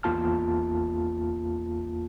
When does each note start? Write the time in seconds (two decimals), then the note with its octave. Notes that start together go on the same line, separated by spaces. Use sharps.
0.03 G#1 E2 A#3 F4 A5 F6